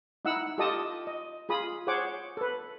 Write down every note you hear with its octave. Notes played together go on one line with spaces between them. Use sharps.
D#4 E4 F#5 E6
F4 G4 A4 D#5 A5 D#6
D#5
F4 G#4 B5 D#6
G#4 C5 C#5 F#5 D6
A4 B4